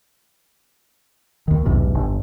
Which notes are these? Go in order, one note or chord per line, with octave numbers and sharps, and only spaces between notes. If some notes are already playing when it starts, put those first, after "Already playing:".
D#2 D#3
B1 E2 G#2 C3
G1